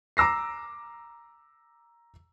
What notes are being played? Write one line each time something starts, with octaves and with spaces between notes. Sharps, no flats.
A#5 D6 E6 A#6 C7